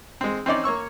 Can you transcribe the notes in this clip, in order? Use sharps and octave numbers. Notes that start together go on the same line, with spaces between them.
G#3 C4
C4 C#4 D#4 D5
A#3 C#5 C#6 E6